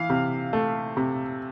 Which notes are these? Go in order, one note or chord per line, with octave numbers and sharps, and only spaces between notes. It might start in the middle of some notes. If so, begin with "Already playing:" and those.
Already playing: E3 F5
C3
A3
C3